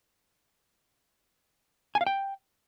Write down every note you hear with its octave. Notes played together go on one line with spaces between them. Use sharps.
G#5
F5
G5